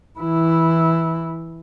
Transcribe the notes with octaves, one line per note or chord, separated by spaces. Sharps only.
E3 E4